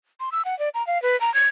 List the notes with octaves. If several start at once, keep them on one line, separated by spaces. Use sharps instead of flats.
C6
E6
F#5
D5
A#5
F5
B4
A#5
G#6